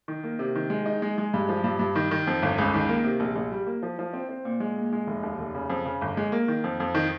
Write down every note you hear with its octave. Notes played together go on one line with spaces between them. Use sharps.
D#3
A#3
C3
D#3
G#3
D#4
G#3
G#3
G2
F3
G2
G2
D#3
D#3
F2
G1
C#2
D#3
A#3
C3
A#1
A#1
G3
A#3
F3
F3
C4
C4
A#2
G#3
A#2
G#3
F1
D#2
F1
C#3
F2
C#3
G1
G#3
A#3
D#3
F2
F2
D#3